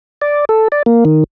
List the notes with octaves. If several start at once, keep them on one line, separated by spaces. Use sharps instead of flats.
D5
A4
D5
A#3
D#3